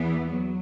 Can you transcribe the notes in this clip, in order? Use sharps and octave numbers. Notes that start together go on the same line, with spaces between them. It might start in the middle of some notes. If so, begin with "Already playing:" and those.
Already playing: E2 E3 B3
F#3